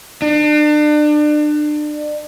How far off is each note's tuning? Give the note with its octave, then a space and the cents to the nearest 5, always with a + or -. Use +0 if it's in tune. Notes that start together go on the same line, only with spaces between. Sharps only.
D4 +35